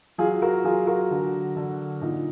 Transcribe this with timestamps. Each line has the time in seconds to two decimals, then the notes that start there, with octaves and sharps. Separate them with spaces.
0.18 F#3 F4 G#4
0.42 F#4 A#4
0.64 F#3 F4 G#4
0.87 F#4 A#4
1.11 D3
1.56 D3
2.01 A#2 D#4